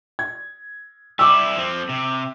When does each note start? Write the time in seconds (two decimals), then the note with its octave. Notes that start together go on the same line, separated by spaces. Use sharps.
0.19 G#6
1.19 G3 E4 D6 E6
1.56 F3 C4
1.89 C3